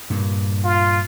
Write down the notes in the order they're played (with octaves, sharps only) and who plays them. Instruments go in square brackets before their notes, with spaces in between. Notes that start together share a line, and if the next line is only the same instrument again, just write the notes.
[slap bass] G2 A#2
[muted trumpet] F4